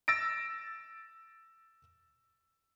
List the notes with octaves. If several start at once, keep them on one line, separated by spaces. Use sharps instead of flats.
E6 A6 A#6 D7